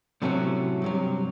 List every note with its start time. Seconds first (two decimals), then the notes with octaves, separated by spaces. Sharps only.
0.22 A2 C3 F#3 A3 C#4 F#4
0.82 G2 C3 F#3